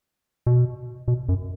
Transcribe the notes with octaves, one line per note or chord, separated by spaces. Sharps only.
B2
B2
F#2